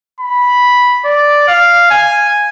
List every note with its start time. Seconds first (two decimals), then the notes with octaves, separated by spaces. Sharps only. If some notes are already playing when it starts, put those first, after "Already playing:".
0.20 B5
1.05 D5
1.48 F5
1.90 G#5